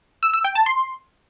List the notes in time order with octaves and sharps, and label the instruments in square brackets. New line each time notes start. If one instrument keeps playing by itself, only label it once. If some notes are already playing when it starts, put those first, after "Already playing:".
[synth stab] E6
E6
G5
A5
C6